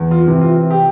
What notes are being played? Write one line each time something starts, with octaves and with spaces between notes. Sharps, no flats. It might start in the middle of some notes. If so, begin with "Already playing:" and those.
Already playing: E2
F4
C3 E3
F4
G4